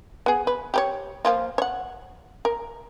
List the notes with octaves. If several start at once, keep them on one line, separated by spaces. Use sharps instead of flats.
B3 G#4
B4
G4 B4 C#5
F3 A#3 F4
C#5 F#5
A#4